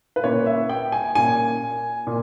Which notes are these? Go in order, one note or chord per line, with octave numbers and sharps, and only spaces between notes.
B4
A#2 A#3 C#4 C#5
E5
G5
G#5
A#2 A#3 C#4 G#5
A#2